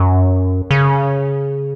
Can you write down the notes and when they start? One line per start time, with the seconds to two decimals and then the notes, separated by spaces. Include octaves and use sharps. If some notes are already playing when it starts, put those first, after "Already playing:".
Already playing: F#2
0.71 C#3